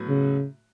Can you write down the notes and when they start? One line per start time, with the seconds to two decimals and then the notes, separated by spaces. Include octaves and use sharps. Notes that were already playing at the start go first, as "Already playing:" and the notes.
Already playing: A2 F#3 B3 F#4
0.08 C#3